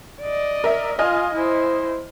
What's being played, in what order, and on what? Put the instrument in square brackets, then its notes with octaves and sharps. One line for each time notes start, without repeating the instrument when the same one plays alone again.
[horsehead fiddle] D5 D#5
[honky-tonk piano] A#4 E5
[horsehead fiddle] F4 [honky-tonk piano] D#5 G#5 F6
[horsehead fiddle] E4 C5